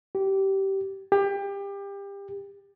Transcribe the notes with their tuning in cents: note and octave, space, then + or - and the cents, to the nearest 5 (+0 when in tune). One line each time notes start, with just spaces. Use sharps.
G4 -20
G4 +25